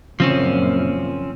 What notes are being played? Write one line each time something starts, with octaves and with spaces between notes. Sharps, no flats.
F#2 A#2 C#3 F3 C4 C#4